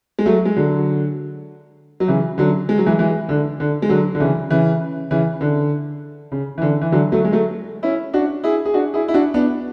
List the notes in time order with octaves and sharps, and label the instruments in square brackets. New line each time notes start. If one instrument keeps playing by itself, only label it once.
[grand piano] G#3
F#3 A3
G#3
D3 F#3
F#3
C#3 E3
D3 F#3
G#3
F#3
E3 G#3
E3 G#3
D3
D3
G#3
D3 F#3
D3
C#3 E3
C#3 E3
C#3 E3
D3
C#3
E3
D3
E3
D3 F#3
F#3 A3
G#3
F#3 A3
C#4 E4
D4 F#4
E4 G#4
G#4
D4 F#4
E4 G#4
E4
D4 F#4
B3 D4